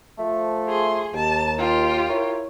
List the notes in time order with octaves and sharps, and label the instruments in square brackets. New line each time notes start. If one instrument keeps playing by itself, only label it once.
[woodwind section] F3 A3
[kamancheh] G#4 C6
[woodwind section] D#2 [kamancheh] A5
[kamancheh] F4 G4
[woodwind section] E4 A#4 C#5